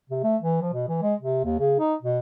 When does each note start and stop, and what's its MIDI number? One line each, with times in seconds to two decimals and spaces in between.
0.10 0.23 48
0.23 0.36 57
0.41 0.59 52
0.62 0.71 53
0.73 0.86 47
0.89 1.01 52
1.02 1.14 56
1.21 1.43 48
1.44 1.56 39
1.60 1.79 49
1.79 1.95 63
2.02 2.19 47